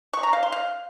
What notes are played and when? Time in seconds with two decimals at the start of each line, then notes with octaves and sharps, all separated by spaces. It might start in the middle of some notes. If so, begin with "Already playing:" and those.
0.13 C#6
0.23 A#5
0.33 F5
0.43 C6
0.52 F5